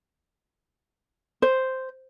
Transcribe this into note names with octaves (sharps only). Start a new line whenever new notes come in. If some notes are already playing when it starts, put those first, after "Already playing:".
C5